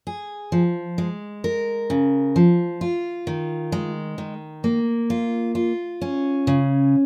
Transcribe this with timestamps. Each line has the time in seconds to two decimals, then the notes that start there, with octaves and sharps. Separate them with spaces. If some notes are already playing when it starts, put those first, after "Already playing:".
0.07 G#4
0.52 F3
0.98 G#3
1.44 A#4
1.90 C#3
2.36 F3
2.81 F4
3.27 D#3
3.72 G#3
4.18 D#3
4.64 A#3
5.10 F4
5.55 F4
6.01 C#4
6.47 C#3